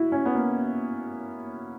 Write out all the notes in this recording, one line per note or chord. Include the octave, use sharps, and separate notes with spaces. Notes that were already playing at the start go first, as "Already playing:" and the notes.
Already playing: E4 F#4
C#4
B3
A#3